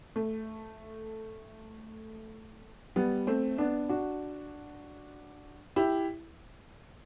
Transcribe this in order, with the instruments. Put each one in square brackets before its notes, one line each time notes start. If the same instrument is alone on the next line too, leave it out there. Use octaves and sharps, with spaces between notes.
[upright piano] A3
G3 B3
A3 C4
B3 D4
D4 F#4
E4 G4